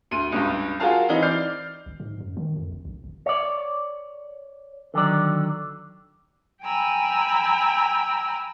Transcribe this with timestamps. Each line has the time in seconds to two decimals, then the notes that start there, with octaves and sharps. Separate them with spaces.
0.11 D2 D#7
0.32 C#2 G2
0.80 F4 F#4 G#4 A#4 F5 A5
1.09 E3 C4 D#4
1.22 D5 F6 G6 C7
1.86 G#1
2.00 G#2
2.20 F#2
2.37 D#3
2.56 F2
2.72 F1
2.85 A#1
3.04 G1
3.26 C#5 D5
4.94 D3 D#3 F#3 D5
6.63 G5 G#5 A#5 B5 E6